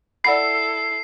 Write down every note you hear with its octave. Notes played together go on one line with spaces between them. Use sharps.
E4 A4 D5 F#5 B5 C7